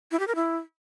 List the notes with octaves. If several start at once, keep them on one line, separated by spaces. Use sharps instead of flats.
E4
G4
A#4
E4